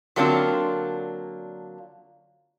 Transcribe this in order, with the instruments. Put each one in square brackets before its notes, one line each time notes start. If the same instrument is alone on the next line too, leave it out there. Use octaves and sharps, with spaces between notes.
[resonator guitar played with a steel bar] D3 F#3 A#3 C4 D4 F4